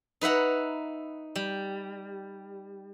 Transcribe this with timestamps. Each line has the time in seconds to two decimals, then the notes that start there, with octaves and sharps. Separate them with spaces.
0.21 D#4 B4 E5 F#5 A#5
1.36 G3